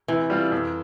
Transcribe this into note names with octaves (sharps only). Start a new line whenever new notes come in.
C3 E3
G3 C4 F4
F2